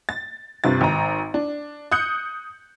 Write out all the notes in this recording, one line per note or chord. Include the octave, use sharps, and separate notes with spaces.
A6
G2 C3 F4 A6
G#1 A#5
D4
D#6 F#6 G6 C#7